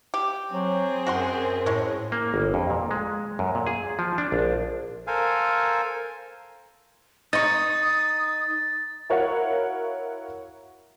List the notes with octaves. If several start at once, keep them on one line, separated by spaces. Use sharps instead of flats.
G4
F#3 C4 G#4
F#2 F#4 F#5 C6
A2 G#3 C#4
A#3
G1
F2
A#2
G#3
F#2
A#2
G#4
F3
D4
A#1
A4 A#4 C5 F5 G#5
D#4 D#5 C#6 D#6 A6
E4 F#4 A#4 C#5 F5 F#5